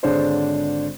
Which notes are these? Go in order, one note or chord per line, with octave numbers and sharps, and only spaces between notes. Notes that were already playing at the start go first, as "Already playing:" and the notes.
G#1 D3 G#3 D4 C5 C#5